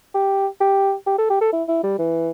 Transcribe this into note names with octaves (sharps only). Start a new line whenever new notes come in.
G4
G4
G4
A4
G4
A4
E4
E4
G3
E3